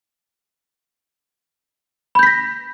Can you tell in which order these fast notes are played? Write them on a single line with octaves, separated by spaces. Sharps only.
B5 G6 B6 A#6